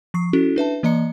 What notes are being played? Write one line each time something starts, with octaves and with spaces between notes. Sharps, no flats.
F3 C#6 C7
C#4 E4 F#4 A4
D4 B4 E5 A5
E3 A#3 D5 D#5 A#5 C#7